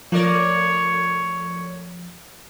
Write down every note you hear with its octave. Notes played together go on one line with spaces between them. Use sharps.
F3 A3 A#4 C#5 D5